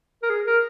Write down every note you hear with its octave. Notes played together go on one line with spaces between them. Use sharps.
A#4
G#4
A#4